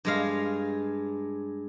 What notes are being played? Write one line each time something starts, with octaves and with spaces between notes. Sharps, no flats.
G2 G#3 F5